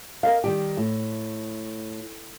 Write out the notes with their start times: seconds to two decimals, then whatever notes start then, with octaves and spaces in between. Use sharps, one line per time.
0.23 A#4 D#5 F5
0.44 D#3 G3 G4
0.77 A2